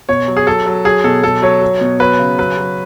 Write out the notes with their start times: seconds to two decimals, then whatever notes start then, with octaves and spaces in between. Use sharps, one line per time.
0.09 B2 C#5
0.28 F#3
0.37 G#4
0.47 F#3 A4
0.66 F#3
0.85 F#3 G#4
1.04 B2 A4
1.23 B2 A4
1.42 F#3 C#5
1.62 F#3
1.81 B2
2.00 F#3 B4
2.19 C#3
2.39 F#3 B4
2.57 F#3